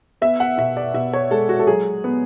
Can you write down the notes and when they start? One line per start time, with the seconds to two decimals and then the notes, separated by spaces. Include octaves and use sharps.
0.22 B3 E5
0.40 F#5
0.58 B2 E5
0.77 D5
0.94 B2 E5
1.13 C#5
1.31 G#3 A4
1.49 F#4
1.59 A4
1.67 F#3 G#4
2.04 B3